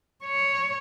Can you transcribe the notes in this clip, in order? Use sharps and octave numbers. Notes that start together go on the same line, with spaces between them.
C#5